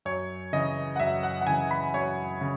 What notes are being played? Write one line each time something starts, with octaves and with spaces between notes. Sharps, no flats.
F#2 C#5
C#3 E3 D#5
F#5
F#2 E5
F#5
F#5
C#3 E3 G#5
B5
F#2 C#5
C#3